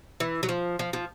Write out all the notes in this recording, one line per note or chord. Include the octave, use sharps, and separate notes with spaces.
E3
F#3
F3
F3
F3